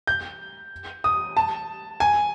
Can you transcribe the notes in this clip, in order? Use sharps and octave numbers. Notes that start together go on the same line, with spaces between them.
G6
D#6
A5
G#5